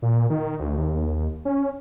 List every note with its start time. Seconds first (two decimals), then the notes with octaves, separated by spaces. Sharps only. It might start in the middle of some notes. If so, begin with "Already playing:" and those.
0.02 A#2
0.30 D#3
0.59 D2
0.77 D#2
1.45 C#4